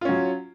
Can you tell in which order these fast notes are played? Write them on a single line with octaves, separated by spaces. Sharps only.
F4 C#4 F#3